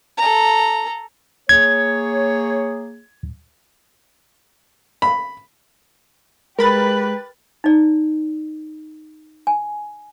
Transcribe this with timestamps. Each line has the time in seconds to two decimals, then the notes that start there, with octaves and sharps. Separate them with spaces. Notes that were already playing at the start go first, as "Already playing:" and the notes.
0.18 A4 A#5
1.49 A#3 G#4 C#5 G#6
5.02 B5
6.59 G#3 G4 A#4 B4 B5 A6
7.64 D#4 D5
9.47 G#5